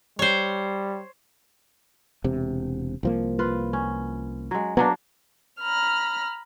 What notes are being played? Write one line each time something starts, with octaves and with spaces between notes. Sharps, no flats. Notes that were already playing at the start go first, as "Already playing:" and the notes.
G3 C5 C#5
E1 C3
C2 F3 A#3
F4 B4
C#4
F#3 G#3
F#3 A#3 B3 D4
A#5 B5 F6